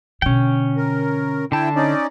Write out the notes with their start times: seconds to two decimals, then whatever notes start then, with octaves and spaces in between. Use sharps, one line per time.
0.22 B2 D3 C#4 G5
0.77 A#4
1.52 D3 E4 G5 A5
1.76 C#4 D#4 D5